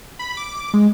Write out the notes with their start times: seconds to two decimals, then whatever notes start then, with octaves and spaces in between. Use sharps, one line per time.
0.19 B5
0.37 D6
0.74 G#3